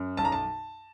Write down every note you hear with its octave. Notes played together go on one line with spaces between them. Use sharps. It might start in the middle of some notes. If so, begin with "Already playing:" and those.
Already playing: F#2
B1 A5
A#5
A5